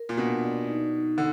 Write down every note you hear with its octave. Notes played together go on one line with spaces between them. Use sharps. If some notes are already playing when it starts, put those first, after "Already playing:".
Already playing: A#4
A#2
B2 D4
D5
D#4
D#4
D3